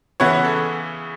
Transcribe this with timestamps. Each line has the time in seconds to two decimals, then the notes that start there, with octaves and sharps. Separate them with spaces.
0.20 C#3 E3 B3 E4 C#5 F#5
0.45 A4